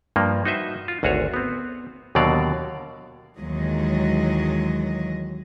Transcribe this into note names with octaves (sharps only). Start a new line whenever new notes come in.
G2 F3 A#3
D#4 F#4 C5 D#5 E5
F4
G#1 D2 F#4 G#4 C#5
B3 C4
D#2 B2 D3 F#3 D5 F5
D#2 E3 F#3 G#3 D#5